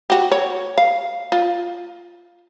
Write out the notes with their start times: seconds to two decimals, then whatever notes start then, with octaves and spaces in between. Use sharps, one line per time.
0.10 F#4 G4
0.32 C#5
0.78 F5
1.32 F4